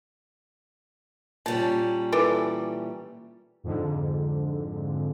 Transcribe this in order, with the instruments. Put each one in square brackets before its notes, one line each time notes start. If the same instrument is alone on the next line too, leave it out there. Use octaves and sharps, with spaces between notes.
[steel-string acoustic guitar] A#2 G3 C#4 [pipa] A5
[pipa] E3 A4 D5
[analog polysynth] F2 G#2 D3